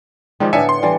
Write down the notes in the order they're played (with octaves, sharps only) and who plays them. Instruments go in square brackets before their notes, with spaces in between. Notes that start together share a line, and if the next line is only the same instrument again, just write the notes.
[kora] D#3 G3 A#3 [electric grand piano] F3 G#3
[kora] A2 D3 B3 [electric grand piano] E5 G#5 C#7
[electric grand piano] C6
[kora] D3 E3 G3